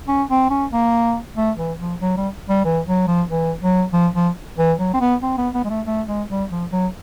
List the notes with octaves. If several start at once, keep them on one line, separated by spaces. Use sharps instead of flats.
C#4
C4
C#4
A#3
A3
E3
F3
F#3
G3
G3
E3
F#3
F3
E3
F#3
F3
F3
E3
F#3
C4
B3
C4
B3
B3
G#3
A3
A3
G#3
G3
F3
F#3